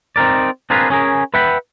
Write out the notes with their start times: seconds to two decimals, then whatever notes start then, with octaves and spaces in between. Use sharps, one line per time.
0.16 C4 D#4 A#4 D5
0.70 C4 D4 F4 G#4 A#4 B4
0.90 C#4 G#4 A#4
1.34 B4 E5 F#5 G5 B5